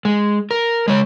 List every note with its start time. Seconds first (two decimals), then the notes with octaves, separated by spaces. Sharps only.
0.05 G#3
0.51 A#4
0.88 G#3 C#5